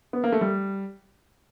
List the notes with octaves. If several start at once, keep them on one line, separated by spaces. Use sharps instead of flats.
B3
A#3
A3
G3